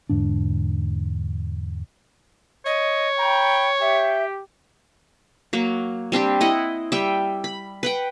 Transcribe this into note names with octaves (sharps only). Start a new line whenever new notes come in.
E2 G#2 D3 D4
C#5 D#5
G5 A#5 B5
G4 E5 G5
F#3 A#3
G3 C4 D4 G4
E4 D#5 F#5
G3 E5 G5
B5
B4 F#5 G5